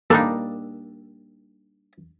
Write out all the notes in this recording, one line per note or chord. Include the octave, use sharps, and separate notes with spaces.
G3 A#3 D4 D#4 A4